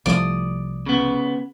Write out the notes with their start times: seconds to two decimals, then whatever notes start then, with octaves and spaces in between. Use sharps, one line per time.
0.06 C2 F3 A3 D5 D#6
0.86 C#3 B3